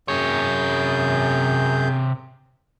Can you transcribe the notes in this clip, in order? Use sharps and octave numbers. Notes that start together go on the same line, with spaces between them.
F#2 C3 G#4 C#5 G6